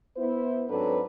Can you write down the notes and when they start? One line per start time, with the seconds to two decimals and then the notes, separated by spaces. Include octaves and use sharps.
0.17 B3 E4 C5
0.69 G#2 F#3 C4 D4 A4 B4